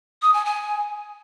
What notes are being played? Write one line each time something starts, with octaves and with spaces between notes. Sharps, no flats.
D#6
G#5
G#5